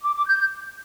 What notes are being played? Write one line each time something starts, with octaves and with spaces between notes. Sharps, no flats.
D6
D6
G6